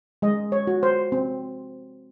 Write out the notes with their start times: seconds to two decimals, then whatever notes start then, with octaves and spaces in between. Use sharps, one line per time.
0.22 G#3 D#5
0.52 C#5
0.67 F#4
0.83 C5
1.12 C4